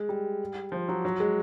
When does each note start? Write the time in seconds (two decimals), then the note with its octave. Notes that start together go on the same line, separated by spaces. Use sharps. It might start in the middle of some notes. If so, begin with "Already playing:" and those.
Already playing: G#3
0.09 G3
0.72 F3
0.88 F#3
1.05 F#3
1.20 G#3